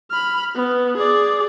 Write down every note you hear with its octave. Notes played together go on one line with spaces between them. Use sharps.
B5 F6
B3
G#4 D5